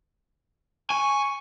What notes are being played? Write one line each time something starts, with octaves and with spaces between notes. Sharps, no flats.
G#5 C#6